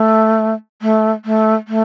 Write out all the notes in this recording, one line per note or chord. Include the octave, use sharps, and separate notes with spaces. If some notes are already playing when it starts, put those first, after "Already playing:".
Already playing: A3
A3
A3
A3